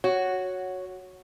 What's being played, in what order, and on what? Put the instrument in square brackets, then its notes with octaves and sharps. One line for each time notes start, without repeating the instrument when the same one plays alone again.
[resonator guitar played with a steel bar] F#4 [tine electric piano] C#5